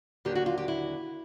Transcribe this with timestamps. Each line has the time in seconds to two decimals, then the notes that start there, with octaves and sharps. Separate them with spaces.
0.25 D#2 D3 F#3 G4
0.35 F#4
0.46 F4
0.57 G4
0.68 E4